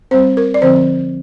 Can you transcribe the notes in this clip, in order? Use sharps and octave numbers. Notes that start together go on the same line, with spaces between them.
G3 C4 C5
A#4
D5
D3 F3 C4 C5